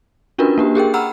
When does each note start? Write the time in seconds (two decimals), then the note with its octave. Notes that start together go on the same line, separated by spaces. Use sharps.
0.38 C#4 D4 F4 F#4 A#4 B4
0.58 A#3 D4 G4
0.75 G4 G#4 A#4 G5
0.94 F#5 G5 A#5 B5 E6 F6